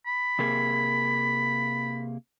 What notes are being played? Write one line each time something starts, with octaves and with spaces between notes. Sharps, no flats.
B5
C3 A#3 G#4